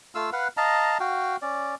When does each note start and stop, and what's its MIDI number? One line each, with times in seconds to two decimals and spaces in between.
0.15 0.30 57
0.15 0.30 65
0.15 0.30 77
0.15 0.30 88
0.33 0.48 71
0.33 0.48 77
0.33 0.48 78
0.57 0.98 75
0.57 0.98 77
0.57 0.98 81
0.57 0.98 82
1.00 1.37 66
1.00 1.37 77
1.00 1.37 79
1.42 1.75 61
1.42 1.75 74